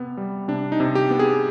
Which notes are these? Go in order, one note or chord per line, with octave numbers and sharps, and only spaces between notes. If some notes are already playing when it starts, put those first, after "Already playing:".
Already playing: C3 B3
G3
C3 D4
D#4
C3
G4
B3
G#4